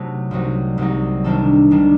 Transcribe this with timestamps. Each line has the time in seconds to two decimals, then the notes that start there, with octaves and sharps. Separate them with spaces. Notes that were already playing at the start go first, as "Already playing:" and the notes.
Already playing: C3 F#3 A3 D#4 F#4
0.31 C2 C3 F#3 C4 D#4
0.78 C2 C3 F#3 C4 D#4
1.24 C3 D#3 G3 D4 A4
1.71 C3 D#3 G3 D4